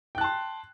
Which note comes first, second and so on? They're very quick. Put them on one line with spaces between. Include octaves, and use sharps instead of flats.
G5 F#6 A5 C6